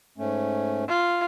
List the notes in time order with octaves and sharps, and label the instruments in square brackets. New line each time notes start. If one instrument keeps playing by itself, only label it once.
[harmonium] G#2 A3 C#4
[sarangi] F4